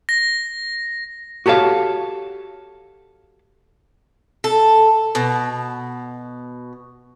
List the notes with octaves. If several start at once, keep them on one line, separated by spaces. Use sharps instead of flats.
A#6
F#4 G4 A4 C#5 F5
A4
B2